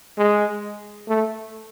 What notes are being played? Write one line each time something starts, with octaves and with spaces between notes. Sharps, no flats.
G#3
A3